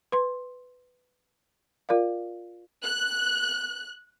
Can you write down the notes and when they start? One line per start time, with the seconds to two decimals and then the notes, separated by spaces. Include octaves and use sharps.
0.12 B4 C6
1.89 F4 A#4 D5 F5
2.83 F#6